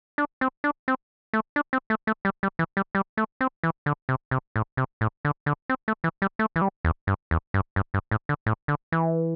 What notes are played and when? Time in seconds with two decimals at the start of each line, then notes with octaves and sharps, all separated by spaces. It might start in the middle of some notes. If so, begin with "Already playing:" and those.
0.18 D4
0.41 C4
0.64 D4
0.88 C4
1.33 A3
1.56 D4
1.73 C4
1.90 A3
2.07 A3
2.25 G3
2.43 G3
2.59 E3
2.77 G3
2.95 G3
3.17 A3
3.41 C4
3.63 E3
3.86 D3
4.09 C3
4.31 C3
4.56 A2
4.77 C3
5.01 A2
5.25 D3
5.46 D3
5.69 C4
5.88 A3
6.04 E3
6.22 G3
6.39 A3
6.56 E3
6.62 G3
6.85 E2
7.07 G2
7.31 E2
7.54 G2
7.76 G2
7.94 G2
8.11 A2
8.29 D3
8.46 A2
8.68 D3
8.92 E3